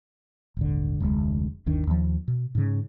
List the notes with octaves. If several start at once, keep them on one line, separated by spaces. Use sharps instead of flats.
D#1 G#1 D3
F1 D2 G#3
G1 D#2 D#3 D4
D#2 F3
B2
G#2 C#3